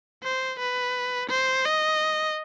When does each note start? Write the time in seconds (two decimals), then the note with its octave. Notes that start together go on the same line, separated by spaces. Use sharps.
0.23 C5
0.59 B4
1.30 C5
1.65 D#5